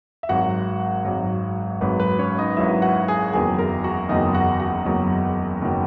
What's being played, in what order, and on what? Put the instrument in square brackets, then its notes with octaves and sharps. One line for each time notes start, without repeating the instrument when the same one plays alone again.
[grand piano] E5
G#1 G#2 F#3 F#4 F#5
G#1 G#2 F#3
G#1 G#2 F#3 B4
B4
C#4 C#5
D#4 D#5
G#1 G#2 F#3 E4 E5
F#4 F#5
G#4 G#5
F#1 E2 D#3 F#3 G#4 G#5
A#4 A#5
F#4 F#5
F#1 E2 D#3 F#3 D#4 D#5
F#4 F#5
F#4 F#5
F#1 E2 D#3 F#3
F#1 D#3 F#3